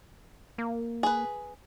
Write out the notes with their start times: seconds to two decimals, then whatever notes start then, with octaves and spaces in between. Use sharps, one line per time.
0.58 A#3
1.03 G#4 B4